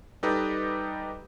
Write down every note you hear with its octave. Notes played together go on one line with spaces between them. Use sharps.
G3 D#4 G4 A4 B4 D#5